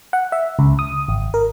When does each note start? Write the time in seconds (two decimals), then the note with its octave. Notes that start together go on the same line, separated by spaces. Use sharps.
0.13 F#5
0.32 E5
0.59 C#2
0.79 D#6
1.08 G#1
1.34 A#4